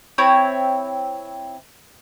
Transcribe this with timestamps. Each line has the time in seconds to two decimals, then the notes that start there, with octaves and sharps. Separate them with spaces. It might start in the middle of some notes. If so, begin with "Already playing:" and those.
0.18 C4 E4 C#5